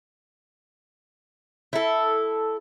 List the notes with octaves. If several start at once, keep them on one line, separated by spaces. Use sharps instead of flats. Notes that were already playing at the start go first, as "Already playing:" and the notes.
E4 A4